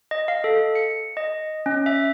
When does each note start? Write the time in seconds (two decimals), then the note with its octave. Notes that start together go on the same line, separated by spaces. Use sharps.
0.11 D#5
0.28 F5
0.44 A4
0.75 C#7
1.17 D#5
1.66 C#4
1.86 E5